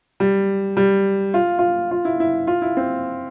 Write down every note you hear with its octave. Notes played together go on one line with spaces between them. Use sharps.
G3
G3
F4
F4
F4
E4
E4
F4
E4
C4